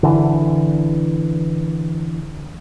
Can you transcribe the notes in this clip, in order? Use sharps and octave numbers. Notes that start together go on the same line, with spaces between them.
D3 E3